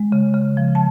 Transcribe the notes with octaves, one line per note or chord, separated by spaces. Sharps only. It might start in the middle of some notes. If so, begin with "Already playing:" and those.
Already playing: G#3
C#3
C#3
F3
A5